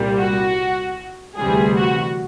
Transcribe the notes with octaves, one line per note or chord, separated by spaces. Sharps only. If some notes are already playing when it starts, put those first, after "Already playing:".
Already playing: C2 A#2 G3
F#4
D2 C3 E3 G3 G#4
F#4